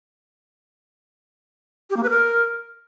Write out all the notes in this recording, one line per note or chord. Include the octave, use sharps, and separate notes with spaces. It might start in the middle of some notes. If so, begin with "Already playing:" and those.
G4
A#3
B4
A#4